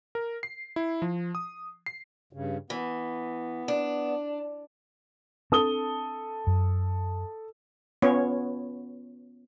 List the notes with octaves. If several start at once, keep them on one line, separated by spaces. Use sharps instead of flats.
A#4
C7
E4
F3
D#6
C7
G2 C#3
E3 B3
D4
C4 D4 A4 D#6 G7
F#2
B3 C#4 F4 C#5